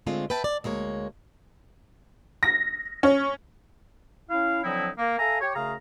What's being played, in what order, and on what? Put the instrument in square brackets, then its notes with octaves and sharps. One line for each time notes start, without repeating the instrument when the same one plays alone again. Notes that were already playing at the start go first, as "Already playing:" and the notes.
[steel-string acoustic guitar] D3 G#3 A3 C4 F4
B4 E5 G5 A5
D5
D2 G#3 A#3 C#5
[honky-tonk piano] A#6
C#4
[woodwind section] C#4 E4 F5
D3 F3 F#3 C4 D#4 E4
A#3
A4 E5 F5 G#5 A#5
G4 C#5
F#2 C#3 A3 G#4 F5 A#5